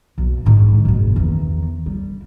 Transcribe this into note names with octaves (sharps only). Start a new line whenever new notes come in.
B1
G#2 D3
F#1 B2
E2 D#3
G3